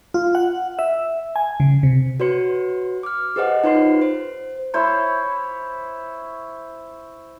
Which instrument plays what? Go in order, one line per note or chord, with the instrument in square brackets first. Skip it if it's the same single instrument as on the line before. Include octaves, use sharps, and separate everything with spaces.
[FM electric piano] F4
F#5
E5
G#5
C#3
C3
[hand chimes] F#4 B4 C#5 C6 C#7
D6 F6
G4 G#4 B4 C5 D#5 F#5
D#4 F4 B4 C#5 C6 C7
C5
[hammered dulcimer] E4 C5 C#5